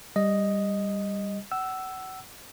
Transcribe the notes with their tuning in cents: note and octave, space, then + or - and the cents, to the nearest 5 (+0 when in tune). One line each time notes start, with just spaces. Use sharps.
G3 +10 D#5 +0
F#5 +30 E6 +0